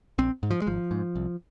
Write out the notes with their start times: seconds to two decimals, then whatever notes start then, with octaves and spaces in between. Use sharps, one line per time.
0.18 A#1 C4
0.43 G#2
0.51 F3
0.62 G#3
0.67 G#1 F3
0.91 G#2
1.16 C2